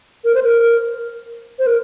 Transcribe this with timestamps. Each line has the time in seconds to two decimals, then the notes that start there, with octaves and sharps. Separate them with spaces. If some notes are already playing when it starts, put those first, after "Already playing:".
0.24 A#4
0.34 C5
0.43 A#4
1.59 C5
1.67 A#4